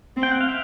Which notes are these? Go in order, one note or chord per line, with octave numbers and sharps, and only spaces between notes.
C4
G5
F#5
F5
E5